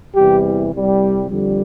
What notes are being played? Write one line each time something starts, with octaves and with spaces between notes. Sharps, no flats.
E2 C3 E3 G3 G4
C2 C3 G3
F2 D3 G3